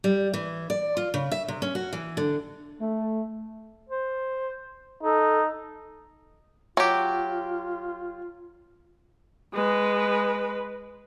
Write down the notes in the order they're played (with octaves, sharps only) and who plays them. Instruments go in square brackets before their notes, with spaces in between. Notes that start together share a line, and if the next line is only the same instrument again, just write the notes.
[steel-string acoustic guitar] G3
E3
D5
F4
C#3
E5
C3
C#4
F#4
E3
D3
[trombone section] A3
[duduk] C5
[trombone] D#4 [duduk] A4
[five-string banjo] F#3 G4 [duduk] F4
[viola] G#3 B4